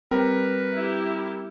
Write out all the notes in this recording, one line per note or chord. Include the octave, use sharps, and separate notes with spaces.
G3 C4 A#4 B4
E4 G4